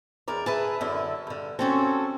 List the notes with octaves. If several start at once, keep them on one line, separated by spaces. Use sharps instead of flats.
E2 A#4 D5
G#4 B4 E5 A5
F#2 D3 E4
G2 D3
C4 C#4 F#4 A4